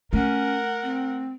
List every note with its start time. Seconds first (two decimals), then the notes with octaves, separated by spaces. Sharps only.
0.13 A3 C#4 A#4 F#5
0.82 C4